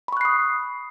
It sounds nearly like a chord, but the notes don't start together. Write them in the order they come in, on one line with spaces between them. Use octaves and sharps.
B5 C#6 F#6 C7 D#6